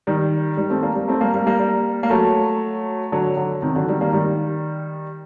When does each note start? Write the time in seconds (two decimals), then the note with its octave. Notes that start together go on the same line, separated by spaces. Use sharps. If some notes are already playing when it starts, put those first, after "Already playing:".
0.07 D#3 G3
0.57 D#3 G3
0.70 A3 C4
0.83 G3 A#3
0.95 G3 A#3
1.08 A3 C4
1.21 G3 A#3
1.34 G3 A#3
1.46 G3 A#3
1.59 G3 A#3
2.03 A#3
2.10 F#3 A3
3.12 D3 F#3
3.37 D3 F#3
3.62 C3 D#3
3.75 D3 F#3
3.88 D#3 G3
4.01 G3 A#3
4.13 D#3 G3